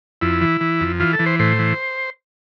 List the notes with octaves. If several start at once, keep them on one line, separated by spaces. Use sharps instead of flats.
F2 E4
E3
E3
F2
E3 F4
A4
E3
C5
A2 C5
E3